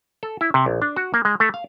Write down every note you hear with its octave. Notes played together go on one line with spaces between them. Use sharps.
A4
E4
C3
A#1
D4
F#4
A#3
G#3
A3
F5